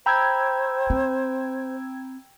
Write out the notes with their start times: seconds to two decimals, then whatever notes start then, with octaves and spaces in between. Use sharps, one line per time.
0.06 C5 G5 A#5 B5 E6 G6 G#6
0.90 C4